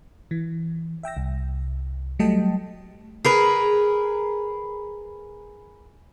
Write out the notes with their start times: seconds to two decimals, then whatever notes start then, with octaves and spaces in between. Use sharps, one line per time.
0.31 E3
1.03 E5 G5 E6 A#6
1.17 C2
2.19 F#3 G3 A3 D#5 G5 A5
3.25 G#4 A#4 B4